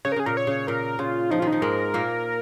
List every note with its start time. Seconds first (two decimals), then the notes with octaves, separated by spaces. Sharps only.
0.05 C#3 C#5
0.12 A#4
0.16 C#3 G#4
0.26 A#2 A#4
0.37 C#5
0.47 C#3
0.67 A#2 A#4
0.99 C#3 F4
1.31 F3 D#4
1.40 D#3 F4
1.47 D#4
1.52 F3
1.62 G#2 G#3 A#4
1.94 A#2 A#3